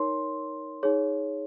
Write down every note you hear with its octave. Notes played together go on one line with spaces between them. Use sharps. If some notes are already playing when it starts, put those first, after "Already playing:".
Already playing: D#4 A#4 C#5 C6
D#4 G#4 C#5